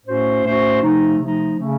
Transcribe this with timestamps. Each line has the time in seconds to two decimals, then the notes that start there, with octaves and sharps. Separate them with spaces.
0.06 A2 A3 C#4 F#4 C5
0.44 A2 A3 C#4 F#4 C5
0.81 C3 F3 A3 D#4
1.18 C3 F3 A3 D#4
1.57 C#3 A3 C#4